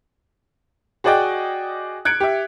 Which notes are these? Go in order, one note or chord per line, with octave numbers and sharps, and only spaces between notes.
F#4 G#4 D5 D#5 G5
F#6 G#6 C#7 D7
G4 E5